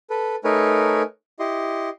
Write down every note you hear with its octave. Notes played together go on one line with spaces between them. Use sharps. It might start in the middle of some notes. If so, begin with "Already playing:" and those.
A4 B4
A3 D#4 A#4 B4 C#5 G#5
E4 G4 D#5 C6